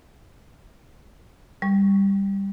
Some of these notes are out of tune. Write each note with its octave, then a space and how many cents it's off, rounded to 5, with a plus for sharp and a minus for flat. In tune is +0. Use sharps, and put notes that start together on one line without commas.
G3 +10 C#6 +0